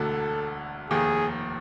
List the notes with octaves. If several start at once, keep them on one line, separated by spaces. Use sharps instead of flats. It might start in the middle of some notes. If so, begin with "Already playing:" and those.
Already playing: E1 D2 D3 A4
F1 D#2 D#3 G#4